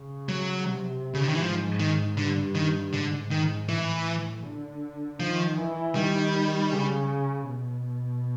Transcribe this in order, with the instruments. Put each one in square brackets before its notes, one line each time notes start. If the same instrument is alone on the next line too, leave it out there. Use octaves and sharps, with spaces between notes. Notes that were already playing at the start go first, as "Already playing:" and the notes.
Already playing: [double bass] C#3
[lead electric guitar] F#3
[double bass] C3
[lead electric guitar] C#3
D3
D#3
E3
[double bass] G#2 [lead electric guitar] F3
[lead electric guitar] D#3
[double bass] G2 [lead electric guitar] D3
[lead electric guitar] D#3
[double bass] G#2 [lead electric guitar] D3
[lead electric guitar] D#3
[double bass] A2 [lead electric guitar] E3
[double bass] D3
[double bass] D#3 [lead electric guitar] F3
[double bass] E3
[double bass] D#3 [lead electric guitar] G3
[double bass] C#3
B2